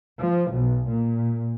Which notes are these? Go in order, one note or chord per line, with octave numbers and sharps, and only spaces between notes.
F3
B1
A#2